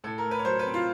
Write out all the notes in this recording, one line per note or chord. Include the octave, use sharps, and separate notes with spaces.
A2 A4
A#4
A3
B4
C#5
F#3 C5
B4
C4
F4